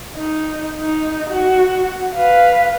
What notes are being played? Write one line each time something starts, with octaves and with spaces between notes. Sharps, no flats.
D#4
D#4
F#4
B4 F5